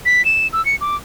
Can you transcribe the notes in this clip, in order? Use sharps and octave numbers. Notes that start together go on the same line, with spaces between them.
B6
E7
E6
C#7
D6